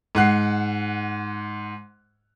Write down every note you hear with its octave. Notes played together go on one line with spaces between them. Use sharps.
G#2 F#5 F#6 C7